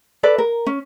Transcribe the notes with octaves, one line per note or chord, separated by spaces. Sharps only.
A4 B4 D5
A#4
C#4